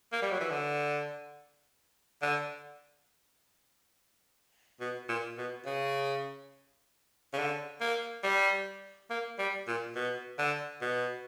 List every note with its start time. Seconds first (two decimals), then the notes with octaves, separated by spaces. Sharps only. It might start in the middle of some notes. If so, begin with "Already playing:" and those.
0.13 A#3
0.22 G3
0.31 F#3
0.40 E3
0.50 D3
2.22 D3
4.80 B2
5.09 A#2
5.38 B2
5.65 C#3
7.33 C#3
7.38 D3
7.81 A#3
8.23 G3
9.10 A#3
9.39 G3
9.67 A#2
9.96 B2
10.38 D3
10.81 B2